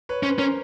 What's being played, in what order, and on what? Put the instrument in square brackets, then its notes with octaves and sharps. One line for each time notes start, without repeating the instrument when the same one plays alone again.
[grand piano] B4 C#5
[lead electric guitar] C#4 [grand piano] C5
[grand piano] B4
[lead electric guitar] C#4 [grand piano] A#4 C5